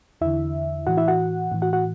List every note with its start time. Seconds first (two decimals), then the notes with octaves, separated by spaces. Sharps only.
0.21 E2 D3 E4 E5
0.87 A2 E3 F#4 F#5
0.97 E4 E5
1.08 F#4 F#5
1.52 A2 E3
1.62 F#4 F#5
1.73 F#4 F#5